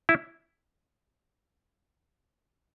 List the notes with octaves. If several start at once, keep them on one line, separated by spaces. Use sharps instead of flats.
E4